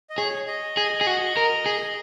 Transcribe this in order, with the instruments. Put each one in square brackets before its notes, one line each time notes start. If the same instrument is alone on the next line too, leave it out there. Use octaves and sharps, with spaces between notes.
[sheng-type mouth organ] D#5
[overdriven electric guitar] G#4 [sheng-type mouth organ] C#5
[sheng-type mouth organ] D#5
[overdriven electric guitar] G#4
G#4
F#4
A#4
G#4